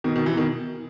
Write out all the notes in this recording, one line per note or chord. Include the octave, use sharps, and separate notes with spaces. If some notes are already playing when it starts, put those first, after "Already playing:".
B2 D#3
B2 D#3
C3 E3
B2 D#3